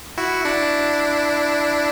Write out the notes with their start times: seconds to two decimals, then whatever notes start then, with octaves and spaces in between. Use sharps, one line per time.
0.17 E4 F#4
0.45 D4 E4